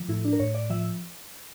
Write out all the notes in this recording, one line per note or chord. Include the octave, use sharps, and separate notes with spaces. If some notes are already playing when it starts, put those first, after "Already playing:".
Already playing: F3
A2 E4
D4
A#4
A2 C#5
D5
F3 E5